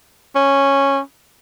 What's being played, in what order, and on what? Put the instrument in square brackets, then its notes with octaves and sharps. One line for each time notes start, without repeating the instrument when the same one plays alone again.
[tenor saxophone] C#4